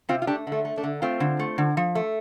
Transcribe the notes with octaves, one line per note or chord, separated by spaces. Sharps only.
C3 C4 F4
F4
A3 D4 G4
D3
A3
A3
A3 D4
D3
A3 C4 F4
D3
A3
D3
F3
A3